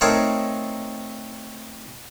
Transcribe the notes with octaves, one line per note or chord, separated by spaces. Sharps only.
A3 C4 D#4 A#4 C#5 F5